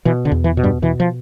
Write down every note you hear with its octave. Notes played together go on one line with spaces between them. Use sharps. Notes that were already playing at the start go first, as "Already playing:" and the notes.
B2 E3
D3
E2
E3
B2
G2 G3
B2 E3
F3